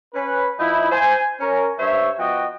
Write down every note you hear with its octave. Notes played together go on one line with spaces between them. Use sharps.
C#4 B4
F3 D#4 E4
C5 G#5
C#4 A#4
G2 C5 C#5 E5
F3 B3 F#4 D#5 G5